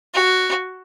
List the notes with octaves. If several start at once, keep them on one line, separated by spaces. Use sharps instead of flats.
F#4